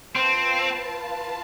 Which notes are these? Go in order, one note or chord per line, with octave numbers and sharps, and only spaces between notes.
C4 F4 B4 F5 A5